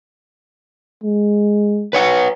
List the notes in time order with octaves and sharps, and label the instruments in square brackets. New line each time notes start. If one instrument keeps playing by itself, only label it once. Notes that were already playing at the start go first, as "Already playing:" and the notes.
[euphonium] G#3
[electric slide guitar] B4 C#5 F#5